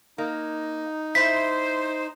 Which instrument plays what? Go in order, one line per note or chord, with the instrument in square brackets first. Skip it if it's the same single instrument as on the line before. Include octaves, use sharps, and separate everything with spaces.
[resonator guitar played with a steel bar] A#3 [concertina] D#4
[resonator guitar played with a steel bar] E4 [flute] C5 [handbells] B6